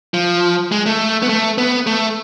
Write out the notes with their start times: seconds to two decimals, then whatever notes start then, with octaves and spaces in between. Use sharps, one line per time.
0.14 F3
0.72 G#3
0.86 A3
1.22 B3
1.29 A3
1.58 B3
1.87 A3